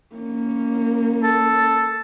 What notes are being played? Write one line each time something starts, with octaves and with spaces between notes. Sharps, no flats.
A#3 C#4
A4